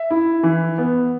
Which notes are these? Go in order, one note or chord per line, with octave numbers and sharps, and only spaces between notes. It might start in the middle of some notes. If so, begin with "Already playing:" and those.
Already playing: E5
E4
E3
B3